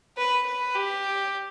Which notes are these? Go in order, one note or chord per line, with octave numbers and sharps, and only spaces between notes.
B4
B4
G4